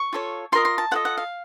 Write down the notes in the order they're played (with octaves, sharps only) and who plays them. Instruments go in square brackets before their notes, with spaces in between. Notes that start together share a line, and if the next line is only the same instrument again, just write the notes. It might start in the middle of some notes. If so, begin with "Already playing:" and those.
Already playing: [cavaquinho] C#6
F4 A4 C#5
F4 A#4 D#5 C6
C6
A5
F4 A4 D#5 F#5
F#5
F5